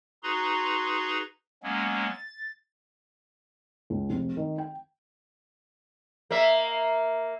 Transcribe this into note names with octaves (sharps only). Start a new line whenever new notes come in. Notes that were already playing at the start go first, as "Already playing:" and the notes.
D#4 F#4 G#4 B4 A#5 C6
F#3 G#3 A#3 B3 C#4
A6
C#2
F1
D#3
G5
A#3 E5